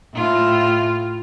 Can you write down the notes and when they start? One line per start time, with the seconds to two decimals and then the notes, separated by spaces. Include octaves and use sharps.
0.14 A2 F4